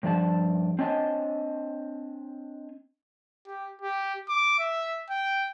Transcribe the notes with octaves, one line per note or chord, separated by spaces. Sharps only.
G2 F3 D4 D5 A5
C4 D4 C#5 D#5 G#5 A5
G4
G4
D6
E5
G5